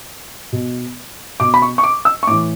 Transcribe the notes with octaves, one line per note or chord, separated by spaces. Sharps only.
B2
B2 D6
B5
C#6
C#6
D6
E6
C#6
A2 E3 D6